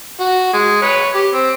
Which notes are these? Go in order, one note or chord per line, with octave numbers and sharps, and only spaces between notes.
F#4
G#3
B4 C#5
G4
C4